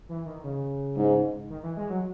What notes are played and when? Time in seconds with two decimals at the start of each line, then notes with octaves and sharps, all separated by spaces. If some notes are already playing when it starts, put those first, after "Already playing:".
0.09 E3
0.26 D#3
0.44 C#3
0.97 G#2
1.50 D#3
1.63 E3
1.77 G#3
1.90 F#3